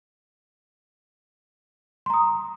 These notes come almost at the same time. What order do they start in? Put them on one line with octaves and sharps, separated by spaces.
C6 A#5 D#6